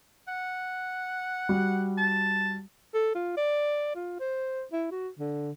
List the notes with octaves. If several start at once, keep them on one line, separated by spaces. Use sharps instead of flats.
F#5
G3 F#4
A5
A4
F4
D5
F4
C5
E4
F#4
D3